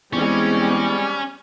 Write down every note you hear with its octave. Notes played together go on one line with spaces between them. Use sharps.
E2 G3 G#3 C4 C#4